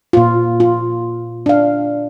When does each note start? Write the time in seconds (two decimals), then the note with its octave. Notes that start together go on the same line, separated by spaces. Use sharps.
0.13 A#2 F4
0.60 F4
1.46 D4 F5